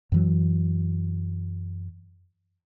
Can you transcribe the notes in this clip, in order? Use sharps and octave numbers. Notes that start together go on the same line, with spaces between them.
F#2 E3 F#3